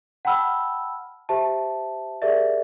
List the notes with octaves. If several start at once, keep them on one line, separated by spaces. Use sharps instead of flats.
F#5 G5 A5 B5 E6 F6
G4 C5 E5 A5
G4 G#4 A#4 D5 E5